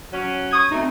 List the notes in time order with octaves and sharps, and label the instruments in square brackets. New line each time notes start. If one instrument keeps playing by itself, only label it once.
[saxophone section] F#3 C#4
[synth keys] C#6 D#6 G#6
[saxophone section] D2 A3 [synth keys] C4 D#4